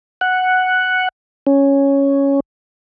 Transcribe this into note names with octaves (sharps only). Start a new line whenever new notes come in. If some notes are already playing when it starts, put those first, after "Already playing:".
F#5
C#4